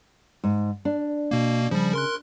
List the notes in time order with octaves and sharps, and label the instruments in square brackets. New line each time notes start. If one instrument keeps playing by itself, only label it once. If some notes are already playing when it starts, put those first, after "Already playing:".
[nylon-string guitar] G#2
D4
[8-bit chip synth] B2 A#3
[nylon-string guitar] C#3 [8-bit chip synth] F3 G3
[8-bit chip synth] A#4 C6 F#6